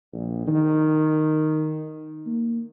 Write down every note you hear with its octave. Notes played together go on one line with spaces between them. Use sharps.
A#1
D#3
A#3